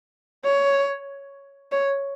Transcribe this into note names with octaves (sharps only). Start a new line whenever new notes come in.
C#5
C#5